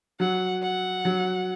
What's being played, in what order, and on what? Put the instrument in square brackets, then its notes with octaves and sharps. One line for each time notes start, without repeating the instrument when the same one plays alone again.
[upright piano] F#3 [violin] F#5
[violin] F#5
[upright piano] F#3